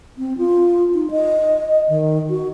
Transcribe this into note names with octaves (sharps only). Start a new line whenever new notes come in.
C4
F4
D#4
D#5
D#3
F#4